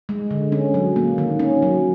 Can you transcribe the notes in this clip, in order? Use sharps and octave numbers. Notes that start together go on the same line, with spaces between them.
G#3
D3
C#4
F#3
A#3
D#3
C#4
F#3